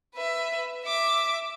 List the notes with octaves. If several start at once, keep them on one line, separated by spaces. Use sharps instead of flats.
B4 E5
E5 D6